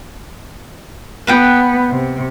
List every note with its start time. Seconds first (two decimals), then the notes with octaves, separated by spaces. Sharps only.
1.27 B3 B4 F#5 G5
1.90 C3